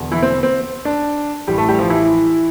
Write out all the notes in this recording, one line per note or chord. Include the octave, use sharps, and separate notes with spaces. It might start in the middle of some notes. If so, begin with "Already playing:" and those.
Already playing: E1 E2 D3
E3 E4
C4
C4
D4
A1 A2 E3 G3 G4
A3 A4
G3 G4
F3 F4
E3 E4